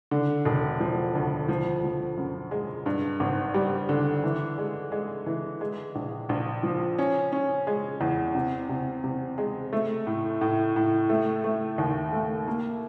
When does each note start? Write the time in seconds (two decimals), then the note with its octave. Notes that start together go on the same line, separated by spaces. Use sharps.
0.11 D3
0.45 E1
0.80 F3
1.15 D2
1.48 F3
1.84 F3
2.17 F#2
2.51 G#3
2.86 G2
3.20 G#1
3.54 G3
3.89 D3
4.23 E3
4.58 G#3
4.92 G#3
5.26 E3
5.61 G#3
5.95 A#1
6.29 A#1
6.63 F3
6.98 C#4
7.32 C#4
7.67 G#3
8.01 E2
8.35 C3
8.69 C3
9.04 C3
9.38 G#3
9.73 A3
10.07 A2
10.41 A2
10.76 A2
11.09 A3
11.44 A3
11.78 D#2
12.13 A3
12.47 A#3